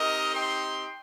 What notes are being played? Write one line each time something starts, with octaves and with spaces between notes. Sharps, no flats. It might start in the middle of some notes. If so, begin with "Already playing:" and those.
Already playing: C4 D#4 G4 A#4 D#5
G5 C6